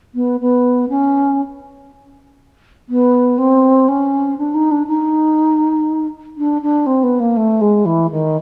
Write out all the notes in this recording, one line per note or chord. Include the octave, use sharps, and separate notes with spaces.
B3
B3
C#4
B3
C4
C#4
D4
D#4
D4
D#4
D4
D4
C4
B3
A#3
A3
G#3
E3
D#3